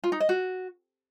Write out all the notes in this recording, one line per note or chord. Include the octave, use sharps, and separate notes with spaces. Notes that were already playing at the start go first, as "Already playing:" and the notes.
F4
D#4
D#5
F#4